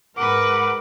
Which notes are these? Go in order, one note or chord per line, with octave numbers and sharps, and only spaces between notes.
G#2 A#4 B4 F#5 D6